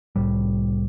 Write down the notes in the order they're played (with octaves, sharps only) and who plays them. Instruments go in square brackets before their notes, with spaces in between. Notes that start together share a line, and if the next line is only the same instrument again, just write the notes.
[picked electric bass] C2 A2 G3